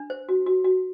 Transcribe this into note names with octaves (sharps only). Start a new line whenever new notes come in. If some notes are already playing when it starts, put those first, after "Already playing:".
Already playing: D4
C5
F#4
F#4
F#4